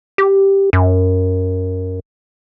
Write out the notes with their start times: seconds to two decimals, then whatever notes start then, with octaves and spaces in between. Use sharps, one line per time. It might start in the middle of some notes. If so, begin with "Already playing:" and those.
0.18 G4
0.73 F#2